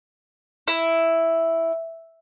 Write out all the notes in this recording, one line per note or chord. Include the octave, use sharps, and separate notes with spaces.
E4